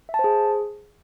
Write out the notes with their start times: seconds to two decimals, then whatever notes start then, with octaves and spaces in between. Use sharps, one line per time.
0.09 E5
0.14 A5
0.19 C5
0.24 G#4